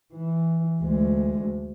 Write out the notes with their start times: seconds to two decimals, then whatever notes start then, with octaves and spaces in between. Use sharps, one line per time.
0.13 E3
0.79 D2 G#3